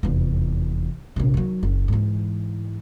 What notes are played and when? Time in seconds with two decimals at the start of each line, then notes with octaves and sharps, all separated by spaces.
0.03 F1 E2
1.16 A#1 C3
1.34 D#3 F#3
1.63 F#1
1.88 G#2 E3